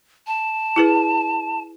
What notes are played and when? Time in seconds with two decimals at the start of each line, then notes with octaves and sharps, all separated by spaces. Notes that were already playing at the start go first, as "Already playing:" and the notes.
0.27 A5
0.76 E4 G#4 B4